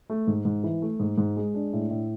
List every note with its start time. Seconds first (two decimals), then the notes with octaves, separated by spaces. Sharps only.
0.10 A3
0.27 G#2
0.45 G#2
0.64 E3
0.82 A3
1.00 G#2
1.18 G#2
1.37 G#3
1.54 D4
1.73 A2
1.91 A2